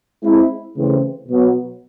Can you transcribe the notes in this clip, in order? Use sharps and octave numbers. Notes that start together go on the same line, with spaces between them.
G#3 C4 E4
C#3 E3 A3 C4
B2 F#3 B3